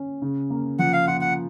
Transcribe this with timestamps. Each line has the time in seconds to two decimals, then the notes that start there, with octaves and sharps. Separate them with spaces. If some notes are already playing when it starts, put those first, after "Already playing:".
Already playing: C#4
0.22 C#3
0.50 A#3
0.79 F3 F#5
0.93 F5
1.07 F4 F#5
1.21 F#5